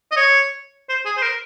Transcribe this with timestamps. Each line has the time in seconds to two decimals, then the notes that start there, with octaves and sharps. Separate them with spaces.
0.11 D#5
0.17 C#5
0.89 C5
1.05 G#4
1.17 C5
1.23 A#4